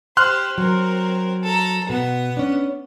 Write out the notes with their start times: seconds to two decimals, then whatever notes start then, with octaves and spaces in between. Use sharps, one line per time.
0.17 G4 C5 C6 F6 F#6
0.58 F#3 C4 A#4
1.43 A4 A#5
1.89 B2 B3 F#5
2.37 C#4 D4